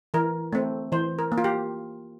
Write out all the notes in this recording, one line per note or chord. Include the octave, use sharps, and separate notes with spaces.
E3 A#4
A3 C4
E3 C5
A#4
A#3
F4
G4